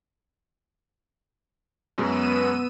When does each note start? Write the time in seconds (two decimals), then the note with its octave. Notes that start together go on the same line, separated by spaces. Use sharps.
1.98 F#2 B2 G#3 B3 E6 D#7